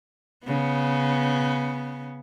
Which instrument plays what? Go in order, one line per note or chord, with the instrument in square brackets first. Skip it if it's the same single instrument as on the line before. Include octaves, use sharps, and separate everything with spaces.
[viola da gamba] C#3 B3